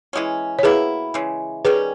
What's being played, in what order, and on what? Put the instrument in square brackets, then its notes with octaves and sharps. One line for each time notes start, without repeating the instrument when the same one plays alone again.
[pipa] E3 G#3 C#4
[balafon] C#5
[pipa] B2 A#3 E4 [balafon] G#4 B4
[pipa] C#3 E3 G#3
[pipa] D#3 G3 C#4 [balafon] G#4 B4